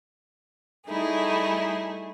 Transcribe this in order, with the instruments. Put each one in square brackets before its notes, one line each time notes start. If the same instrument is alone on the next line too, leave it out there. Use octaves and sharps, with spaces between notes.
[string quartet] G3 A3 D#4 E4 G#4